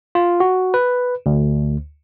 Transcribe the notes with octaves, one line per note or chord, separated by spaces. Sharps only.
F4
F#4
B4
D2